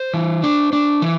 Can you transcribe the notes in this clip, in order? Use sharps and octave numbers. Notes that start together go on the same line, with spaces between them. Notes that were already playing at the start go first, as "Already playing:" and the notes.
Already playing: C5
E3
D4
D4
E3